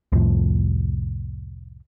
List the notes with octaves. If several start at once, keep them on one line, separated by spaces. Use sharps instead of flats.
C2 F2 A2 F3